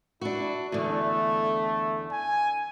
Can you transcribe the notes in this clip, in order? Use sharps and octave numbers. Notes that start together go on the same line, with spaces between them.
D4 E4 F#4
E2 D3 A3
G#5